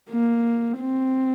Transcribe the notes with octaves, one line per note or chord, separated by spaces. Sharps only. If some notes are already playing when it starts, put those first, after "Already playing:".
A#3
C4